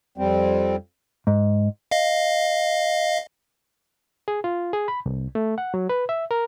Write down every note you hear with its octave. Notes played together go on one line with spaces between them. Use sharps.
F2 G3 C4
G#2
D#5 F5
G#4
F4
G#4
B5
C2
A3
F#5
F#3
B4
E5
A#4